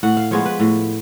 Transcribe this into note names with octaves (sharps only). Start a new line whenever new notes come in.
A2 F#5
F5
F3 G#3 B3 C#5
B4
A2